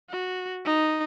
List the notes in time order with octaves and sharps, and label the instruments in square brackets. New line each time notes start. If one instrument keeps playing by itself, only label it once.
[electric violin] F#4
D#4